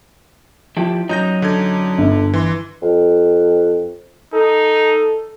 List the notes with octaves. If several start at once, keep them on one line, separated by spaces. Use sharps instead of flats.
F3 E4 G4
F#2 F#3 D#4 A#5 G6 A#6
D3 G#6
G1
E3 C6
F2
D#4 A4